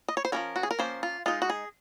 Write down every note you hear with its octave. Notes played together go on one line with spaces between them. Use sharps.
D#5
C#5
C5
F3 A#3 C#4 A#4
F#4
G#4
A#4
F3 A#3 C#4 C5
F4
G#3 D#4 F4
F#4
G#4